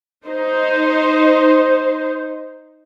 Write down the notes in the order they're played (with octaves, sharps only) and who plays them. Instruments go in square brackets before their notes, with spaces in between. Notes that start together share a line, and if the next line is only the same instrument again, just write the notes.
[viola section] D#4 C5